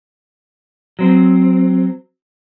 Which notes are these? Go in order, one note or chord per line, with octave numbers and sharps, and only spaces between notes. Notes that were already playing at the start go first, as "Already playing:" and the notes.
F#3 C4